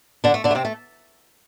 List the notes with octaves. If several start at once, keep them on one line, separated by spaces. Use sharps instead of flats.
D3 D4
A3
D3 D4
A3
C3 C4
A3